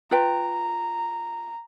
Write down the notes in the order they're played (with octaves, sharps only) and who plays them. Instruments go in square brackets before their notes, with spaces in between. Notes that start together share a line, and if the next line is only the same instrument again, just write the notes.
[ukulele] F4 B4 G5 [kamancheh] A#5